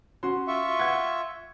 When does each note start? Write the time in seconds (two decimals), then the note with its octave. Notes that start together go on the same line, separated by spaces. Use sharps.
0.23 C#4 F#4 C6
0.48 F4 E5 C#6
0.80 F#5 G#6